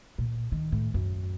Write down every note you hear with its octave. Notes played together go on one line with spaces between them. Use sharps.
A#2
D#3
A2
F#2